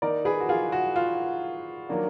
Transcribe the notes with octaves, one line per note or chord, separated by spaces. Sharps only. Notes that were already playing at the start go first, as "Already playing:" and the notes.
D#3 A#3 D#4 A#4 D5
G#4 B4
F#4
F4 G#4
F#4
F4
D#3 F#3 A#3 D4